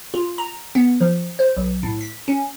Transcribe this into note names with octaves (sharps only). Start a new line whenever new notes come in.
F4
A#5
B3
F3
C5
B1
A2
B6
C#4